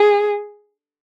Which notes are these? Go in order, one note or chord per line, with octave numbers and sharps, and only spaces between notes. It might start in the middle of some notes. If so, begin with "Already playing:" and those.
Already playing: G#4